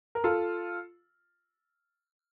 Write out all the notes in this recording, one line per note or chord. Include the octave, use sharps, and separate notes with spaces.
A#4
F4 A4